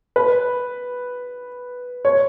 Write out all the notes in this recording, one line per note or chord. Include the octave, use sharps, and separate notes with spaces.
B4
C#5